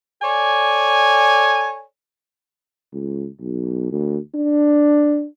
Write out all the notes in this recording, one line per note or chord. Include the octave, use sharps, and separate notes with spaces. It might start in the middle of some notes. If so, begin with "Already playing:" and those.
A4 C#5 D5 G#5
C#2
B1
D2
D4